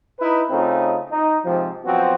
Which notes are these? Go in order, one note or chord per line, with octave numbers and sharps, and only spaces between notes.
D#4 E4 B4
C#3 A3 C4 D#4 F4
D#4
G#2 C3 F3
F3 F#3 B3 C4 F#4